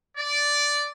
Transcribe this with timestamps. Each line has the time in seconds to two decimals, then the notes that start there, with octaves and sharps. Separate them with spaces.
0.17 D5